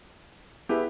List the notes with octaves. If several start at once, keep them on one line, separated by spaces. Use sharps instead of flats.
B3 E4 G4 G#4 B4